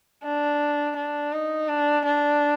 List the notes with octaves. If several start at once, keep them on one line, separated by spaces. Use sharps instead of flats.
D4
D4
D#4
D4
D4